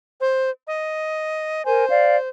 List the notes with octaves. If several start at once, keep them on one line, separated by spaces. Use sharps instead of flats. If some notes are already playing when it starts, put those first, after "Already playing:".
C5
D#5
A#4 C5 G#5
D5 F5